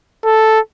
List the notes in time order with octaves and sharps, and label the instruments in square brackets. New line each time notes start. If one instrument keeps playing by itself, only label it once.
[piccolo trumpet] A4